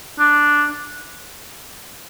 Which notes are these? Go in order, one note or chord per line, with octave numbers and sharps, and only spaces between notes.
D4